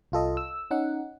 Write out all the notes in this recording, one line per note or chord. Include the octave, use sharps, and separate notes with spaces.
C2 F4 A4 D#5
E6
C#4 D#4 F#5